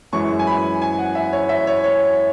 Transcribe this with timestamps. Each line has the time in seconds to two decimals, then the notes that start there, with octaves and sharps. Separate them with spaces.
0.12 F#2 E3 G#3 C#4 C#6
0.39 G#5
0.47 B5
0.82 G#5
0.98 F#5
1.15 E5
1.33 C#5
1.49 E5
1.67 C#5
1.84 C#5